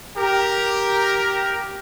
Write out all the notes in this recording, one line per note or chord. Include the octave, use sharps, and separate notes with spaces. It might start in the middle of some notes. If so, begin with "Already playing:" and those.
G4 A#4